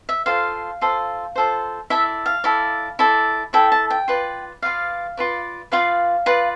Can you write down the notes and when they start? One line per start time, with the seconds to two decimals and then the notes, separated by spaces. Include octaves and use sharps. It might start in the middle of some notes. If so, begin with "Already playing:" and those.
0.09 E5
0.26 F4 A4 C5 F5
0.81 F4 A4 C5
1.35 F4 A4 C5
1.90 E4 A4 D5 E5
2.26 F5
2.44 E4 A4 D5
2.99 E4 A4 D5
3.53 E4 A4 D5 G5
3.72 A5
3.90 G5
4.08 F4 B4 D5
4.62 F4 B4 D5 F5
5.17 F4 B4 D5
5.72 F4 B4 D5 F5
6.26 F4 B4 D5